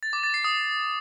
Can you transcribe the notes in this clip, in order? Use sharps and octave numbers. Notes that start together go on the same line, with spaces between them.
A6
D6
A6
C7
D#6